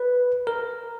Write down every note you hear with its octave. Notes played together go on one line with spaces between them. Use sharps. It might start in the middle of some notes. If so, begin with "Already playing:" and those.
Already playing: B4
A#4